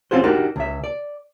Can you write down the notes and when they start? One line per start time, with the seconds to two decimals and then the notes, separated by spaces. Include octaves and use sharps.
0.11 C4 C#4 F4 F#4 G#4 C5
0.23 D4 D#4 F#4 G4 A#4
0.56 C#2 E5
0.84 D5